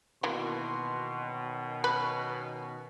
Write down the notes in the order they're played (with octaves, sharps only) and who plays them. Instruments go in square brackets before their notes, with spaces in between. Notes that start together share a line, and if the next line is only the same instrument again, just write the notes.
[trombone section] B2 D#3 [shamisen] E3 A#3 [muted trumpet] C6
[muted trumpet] C#4
[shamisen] B4